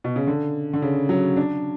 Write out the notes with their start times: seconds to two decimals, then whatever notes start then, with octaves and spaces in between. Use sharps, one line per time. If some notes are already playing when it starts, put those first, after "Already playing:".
0.04 B2
0.16 C#3
0.27 D3
0.73 D3
0.82 C#3
1.09 F#3
1.37 D4